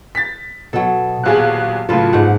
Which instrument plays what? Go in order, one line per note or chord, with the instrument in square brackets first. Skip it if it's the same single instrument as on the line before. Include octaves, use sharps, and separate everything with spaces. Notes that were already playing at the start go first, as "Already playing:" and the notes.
[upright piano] A6 B6
[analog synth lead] B2 [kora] F#3 A4
[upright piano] D#1 B1 G#4 [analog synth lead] F#6
[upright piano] A2 C#3 F#3 [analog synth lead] F4 [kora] A4 B4
[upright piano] F#1 [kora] G#2 F#5